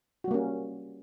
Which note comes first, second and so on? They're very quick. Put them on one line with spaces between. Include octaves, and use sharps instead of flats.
F#4 G3 A#3 C#4